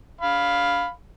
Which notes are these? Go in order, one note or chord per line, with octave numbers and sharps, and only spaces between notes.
F5 B5